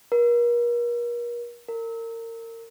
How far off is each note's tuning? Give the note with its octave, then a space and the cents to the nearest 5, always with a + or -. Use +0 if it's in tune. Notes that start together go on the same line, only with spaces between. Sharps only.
A#4 +40
A#4 -30